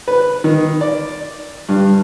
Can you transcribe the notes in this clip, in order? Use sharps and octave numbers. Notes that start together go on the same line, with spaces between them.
B4
D#3
D5
G2